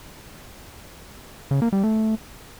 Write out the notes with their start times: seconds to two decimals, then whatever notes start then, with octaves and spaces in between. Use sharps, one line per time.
1.51 C#3
1.62 A#3
1.73 G3
1.83 A3